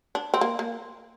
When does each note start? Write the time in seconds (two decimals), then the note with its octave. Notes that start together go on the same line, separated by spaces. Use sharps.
0.15 D4
0.34 C4
0.41 A#3
0.59 A#3